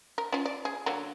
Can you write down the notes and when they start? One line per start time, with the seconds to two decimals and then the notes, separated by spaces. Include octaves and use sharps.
0.18 A#4
0.32 C#4 F4
0.45 D5
0.65 G#4
0.86 D3 F#3 A#3